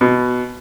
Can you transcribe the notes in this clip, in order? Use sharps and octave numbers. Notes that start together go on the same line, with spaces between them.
B2